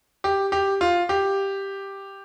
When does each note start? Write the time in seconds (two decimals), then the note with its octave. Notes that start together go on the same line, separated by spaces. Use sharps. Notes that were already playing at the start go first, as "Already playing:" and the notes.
0.24 G4
0.52 G4
0.81 F4
1.09 G4